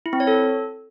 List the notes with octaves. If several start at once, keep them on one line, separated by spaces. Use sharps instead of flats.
E4
C4
C#5
A4